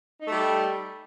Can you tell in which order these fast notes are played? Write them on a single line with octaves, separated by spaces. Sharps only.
D#4 A3 G3